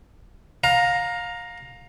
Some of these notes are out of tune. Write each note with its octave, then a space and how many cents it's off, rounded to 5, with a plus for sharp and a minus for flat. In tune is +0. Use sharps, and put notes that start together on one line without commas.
F5 +25 A#5 +0